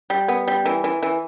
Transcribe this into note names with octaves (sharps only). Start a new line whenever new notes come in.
G3
B3
G3
E3
E3
E3